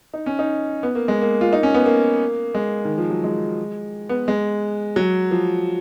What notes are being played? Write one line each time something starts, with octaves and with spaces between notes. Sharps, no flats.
D#4
C#4
D#4
B3
A#3
G#3
A#3
F4
D#4
C#4
B3
A#3
G#3
D#3
F3
F#3
G#3
B3
G#3
F#3
F3